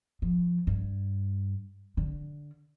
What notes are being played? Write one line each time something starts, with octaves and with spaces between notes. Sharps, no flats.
F3
G2
D3